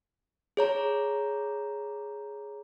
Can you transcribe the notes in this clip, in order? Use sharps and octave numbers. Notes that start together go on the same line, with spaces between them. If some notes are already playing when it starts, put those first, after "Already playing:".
G#4 C#5 A#5